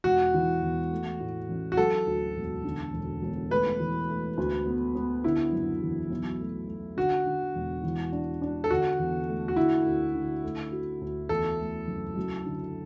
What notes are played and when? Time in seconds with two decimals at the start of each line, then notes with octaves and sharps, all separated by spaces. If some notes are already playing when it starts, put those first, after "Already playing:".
0.04 E1 F#4
0.34 E3
0.62 E2
0.92 A3
1.20 A2
1.49 A1
1.72 F#4
1.77 F#3 A4
2.07 D2
2.36 E1
2.64 D3
2.94 E1
3.22 E1
3.51 A3 B4
3.80 E3
4.08 A3
4.37 D2
4.66 B3
4.95 B3
5.24 D3 E4
5.53 F#1
5.82 E2
6.10 B1
6.40 A3
6.68 A3
6.97 D3 F#4
7.26 D3
7.55 E1
7.83 E3
8.12 D4
8.42 D4
8.64 A4
8.70 D3 F#4
8.99 E2
9.28 A3
9.48 F#4
9.56 D3 E4
9.86 D2
10.15 D3
10.43 A3
10.72 F#4
11.01 D2
11.29 E2 A4
11.59 A3
11.88 F#1
12.16 F#2
12.45 D3